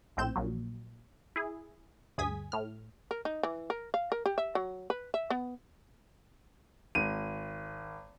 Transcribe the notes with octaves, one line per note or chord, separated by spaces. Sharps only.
A#1 A2 C4 G6 E7
A#1 A#2 F#3
E4 G#4
D2 G2 G#4 D#6 G#6 B6
A2 F6
A#4
D#4
E3
A#4
F5
A#4
G4
E5
F#3
B4
E5
B3
G#1 D#7